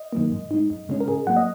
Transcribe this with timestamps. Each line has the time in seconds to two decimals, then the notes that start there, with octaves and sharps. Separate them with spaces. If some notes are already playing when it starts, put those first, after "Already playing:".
Already playing: D#5
0.13 F#2 D#3 F#3 A#3
0.32 G#2
0.51 G#3 D#4
0.70 F#2
0.89 C#3 G#3 C#4
1.00 A#4
1.08 G#2 G#4
1.27 F#3 A#3 F#5
1.36 D#5